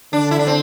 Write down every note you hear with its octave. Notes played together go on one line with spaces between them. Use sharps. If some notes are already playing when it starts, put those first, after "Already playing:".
D3 D4
E4
D4
C4